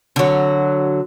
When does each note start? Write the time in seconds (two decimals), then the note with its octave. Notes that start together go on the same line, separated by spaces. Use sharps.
0.16 D3 F#3